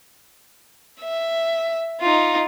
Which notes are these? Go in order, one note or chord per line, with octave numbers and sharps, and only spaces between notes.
E5
D#4 F4